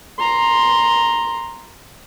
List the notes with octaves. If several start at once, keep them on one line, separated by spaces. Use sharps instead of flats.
A#5 C6